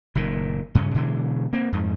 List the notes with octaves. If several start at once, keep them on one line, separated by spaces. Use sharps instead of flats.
F#1 A#2 D#3
G2 C#3 C#4
B2 D3 E3 G#3
A#3 C4
F2 G#2